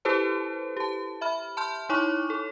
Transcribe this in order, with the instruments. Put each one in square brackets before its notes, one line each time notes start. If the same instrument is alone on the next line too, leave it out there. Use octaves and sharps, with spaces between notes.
[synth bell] E4 G4 A4 B4 C5 A5
G4 A5
E5 B5 F6
A5 C6 F6 G6
D#4 E4 C#5 C#6 D6
A4